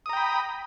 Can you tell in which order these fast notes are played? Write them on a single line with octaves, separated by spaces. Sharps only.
D#6 A#5 G5 B5